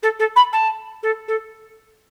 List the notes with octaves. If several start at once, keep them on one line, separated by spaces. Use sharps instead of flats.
A4
A4
B5
A5
A4
A4